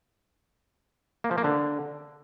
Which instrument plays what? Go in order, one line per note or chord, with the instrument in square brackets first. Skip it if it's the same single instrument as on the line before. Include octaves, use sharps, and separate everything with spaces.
[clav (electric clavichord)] A#3
F3
A#3
D3